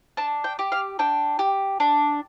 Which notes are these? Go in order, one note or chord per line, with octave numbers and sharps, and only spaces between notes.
D4 A5
G5
G4
F5
D4 G5
G4
D4